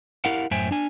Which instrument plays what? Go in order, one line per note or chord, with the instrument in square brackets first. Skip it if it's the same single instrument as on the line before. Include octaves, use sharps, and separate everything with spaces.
[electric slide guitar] E4 G4 A#4 F5 F#5
F#2 A2 C5 E5 G5 G#5
D4 G#5